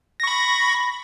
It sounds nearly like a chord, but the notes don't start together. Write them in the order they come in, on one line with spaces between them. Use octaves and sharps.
A#6 C#6 B5